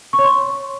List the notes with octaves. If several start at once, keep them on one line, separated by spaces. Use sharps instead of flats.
C#6
C#5
C6